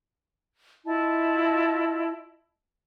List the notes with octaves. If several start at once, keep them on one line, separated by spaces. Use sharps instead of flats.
E4 F4 D#5 A5